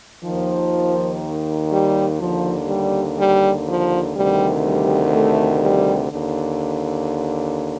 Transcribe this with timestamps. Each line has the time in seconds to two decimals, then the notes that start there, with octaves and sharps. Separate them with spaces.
0.24 D#2 D#3 F3
1.71 G3
2.19 D#2 D3 F3
2.68 G3
3.18 G3
3.67 F3
4.15 D2 C3 D#3 G3
4.65 G3
5.13 A3
5.62 G3
6.11 D#2 D3